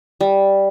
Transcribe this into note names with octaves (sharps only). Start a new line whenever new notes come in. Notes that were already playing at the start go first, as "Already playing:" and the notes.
G3